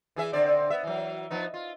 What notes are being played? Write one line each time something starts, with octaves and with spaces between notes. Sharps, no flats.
E3 G#4 E5
D3 C4 D5
B3 E5
E3 F#3
F3 B3 D#4
F4